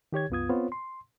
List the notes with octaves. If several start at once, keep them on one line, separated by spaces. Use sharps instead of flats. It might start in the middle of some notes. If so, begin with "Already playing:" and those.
D#3 G4 C#5 G#6
C2 F#2 B3 F4 D#6 G#6
B3 C4 F4 C5 C#5
C6